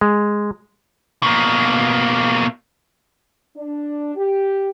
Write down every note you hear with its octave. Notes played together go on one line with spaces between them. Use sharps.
G#3
B2 A#3
D4
G4